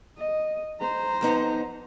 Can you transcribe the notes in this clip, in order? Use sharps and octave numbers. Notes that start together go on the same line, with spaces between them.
D#5
C5 A#5
F2 B3 D#4